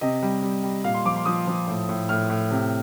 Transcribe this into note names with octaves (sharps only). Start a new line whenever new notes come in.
C3 D#5
G3
G3
G3
A#2 F5
C6
F3 D6
C6
F3 D#6
F3
A2
A2
A2 F6
A2
C3